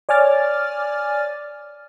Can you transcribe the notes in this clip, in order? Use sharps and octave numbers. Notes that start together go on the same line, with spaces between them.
C#5 D5 G#5 D6 F6 A6